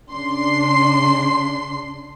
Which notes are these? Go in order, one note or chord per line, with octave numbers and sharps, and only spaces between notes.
C#3 D4 C6 C7